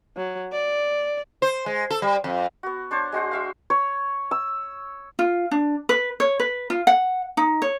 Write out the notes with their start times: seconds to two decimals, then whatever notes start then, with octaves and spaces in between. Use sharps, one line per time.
0.17 F#3
0.53 D5
1.42 C5
1.66 G#3
1.91 A4
2.02 G3
2.24 F2
2.63 B3 F#4
2.91 D4 C5 C#5 A5
3.12 G#3 F#4 C5 F#5
3.31 F#4 E5 F5
3.70 C#5
4.31 E6
5.19 F4
5.51 D4
5.89 B4
6.20 C#5
6.40 B4
6.70 F4
6.87 F#5
7.37 D#4
7.62 C#5